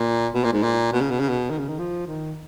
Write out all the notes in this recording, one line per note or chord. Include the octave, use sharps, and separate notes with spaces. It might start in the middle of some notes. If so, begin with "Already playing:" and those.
Already playing: A#2
B2
A#2
G#2
A#2
B2
C#3
B2
C#3
B2
D#3
C#3
D#3
F3
D#3